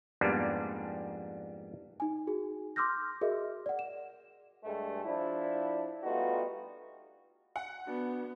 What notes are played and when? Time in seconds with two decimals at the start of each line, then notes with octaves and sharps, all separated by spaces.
0.21 F2 G#2 G3 A#3 B3 D4
2.00 D#4 G#5
2.27 F#4 G#4
2.76 C6 D6 E6 F6 G6 A#6
3.21 F#4 G#4 A#4 D#5 E5
3.66 D5 F#5
3.79 E7
4.64 G2 G#3 A3
5.04 F3 D4 E4
6.03 G3 A3 B3 D#4 F4 F#4
7.56 F#5
7.87 B3 D4 F#4 D5